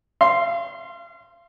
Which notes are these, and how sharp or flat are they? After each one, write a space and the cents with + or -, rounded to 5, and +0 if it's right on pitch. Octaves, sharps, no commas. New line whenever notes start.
F5 -35 C6 +0